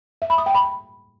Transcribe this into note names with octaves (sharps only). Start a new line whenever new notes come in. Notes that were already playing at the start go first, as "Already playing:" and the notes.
E5
B5
D#6
G5
B5